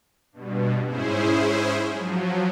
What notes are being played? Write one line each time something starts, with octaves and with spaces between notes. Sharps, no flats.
G2 B2
G#2 C#4 E4 G#4 C5
F3 F#3